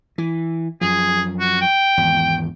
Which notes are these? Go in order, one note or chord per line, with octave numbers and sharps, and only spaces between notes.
E3
F#2 F3 G#4
F#4
G5
G#1 E2